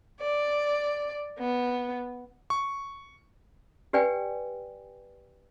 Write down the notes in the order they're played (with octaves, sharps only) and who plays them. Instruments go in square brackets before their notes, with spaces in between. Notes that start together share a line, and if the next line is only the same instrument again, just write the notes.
[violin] D5
B3
[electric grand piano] C#6
[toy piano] G4 B4 D5 G5 G#5